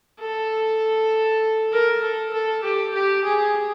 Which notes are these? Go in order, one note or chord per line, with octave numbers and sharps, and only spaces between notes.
A4
A#4
A4
A4
G4
G4
G#4